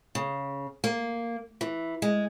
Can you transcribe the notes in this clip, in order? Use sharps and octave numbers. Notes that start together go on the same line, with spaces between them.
C#3
A#3
E3
G#3